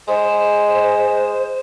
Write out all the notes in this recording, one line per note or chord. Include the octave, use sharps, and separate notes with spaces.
G#3 C5